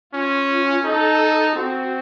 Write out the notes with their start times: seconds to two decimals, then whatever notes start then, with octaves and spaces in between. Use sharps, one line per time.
0.14 C#4 F4
0.84 D#4 A4
1.55 C4 F#4